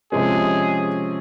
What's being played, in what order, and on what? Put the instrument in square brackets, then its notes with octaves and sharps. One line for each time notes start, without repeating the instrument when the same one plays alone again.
[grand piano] C3 F3 G#3 C#4 [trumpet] G#4